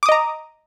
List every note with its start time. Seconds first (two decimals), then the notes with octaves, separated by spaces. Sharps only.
0.03 D6
0.06 D#6
0.09 D#5
0.12 A#5